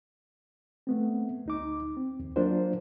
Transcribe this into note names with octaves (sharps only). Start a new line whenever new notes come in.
A3 B3 C4
D2 D#4 D6
C4
D#2
F#3 A#3 D4 F4 A#4 C5